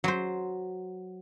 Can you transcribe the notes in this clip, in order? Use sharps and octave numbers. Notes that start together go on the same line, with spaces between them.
F#3 C5